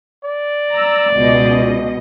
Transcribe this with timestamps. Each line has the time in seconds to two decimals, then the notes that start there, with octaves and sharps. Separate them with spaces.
0.24 D5
0.72 A#5 E6
1.13 C#2 B2 D#5